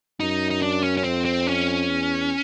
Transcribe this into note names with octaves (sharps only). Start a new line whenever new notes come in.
F#2 D#4
D#4
D4
C#4
C#4
F2 C4
C4
C#4
E2